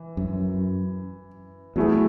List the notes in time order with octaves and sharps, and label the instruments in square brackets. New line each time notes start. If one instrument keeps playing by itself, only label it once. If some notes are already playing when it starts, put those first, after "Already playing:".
Already playing: [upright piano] E3
[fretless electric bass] F#2
[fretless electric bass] E2 [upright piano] F#3 A3 E4 G#4